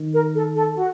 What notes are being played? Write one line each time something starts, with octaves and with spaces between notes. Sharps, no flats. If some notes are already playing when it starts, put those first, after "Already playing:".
Already playing: D#3
A#4
A4
A4
F#4